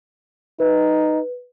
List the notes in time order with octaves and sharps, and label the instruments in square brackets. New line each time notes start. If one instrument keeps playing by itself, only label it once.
[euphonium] D#4 [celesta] B4